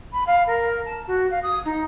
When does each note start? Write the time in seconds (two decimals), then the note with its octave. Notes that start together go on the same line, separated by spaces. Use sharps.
0.13 B5
0.27 F5
0.47 A#4
0.85 A5
1.07 F#4
1.31 F5
1.43 D#6
1.65 D#4